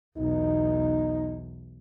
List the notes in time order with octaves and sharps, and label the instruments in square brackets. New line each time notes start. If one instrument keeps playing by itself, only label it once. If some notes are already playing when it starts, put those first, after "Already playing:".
[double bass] B1 E2 [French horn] D#4